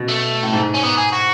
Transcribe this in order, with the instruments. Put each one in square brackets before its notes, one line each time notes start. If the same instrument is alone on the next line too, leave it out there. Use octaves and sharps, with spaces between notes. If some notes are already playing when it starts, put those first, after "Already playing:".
Already playing: [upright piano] B2
[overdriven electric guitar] A3
[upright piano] A2
G#2
[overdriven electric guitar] C#4
B3
G#4
F#4